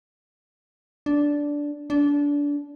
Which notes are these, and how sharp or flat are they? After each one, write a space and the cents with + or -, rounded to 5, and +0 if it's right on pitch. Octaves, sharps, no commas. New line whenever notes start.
D4 -10
D4 -25